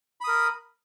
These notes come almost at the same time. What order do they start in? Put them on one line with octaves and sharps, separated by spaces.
B5 D#6 A#4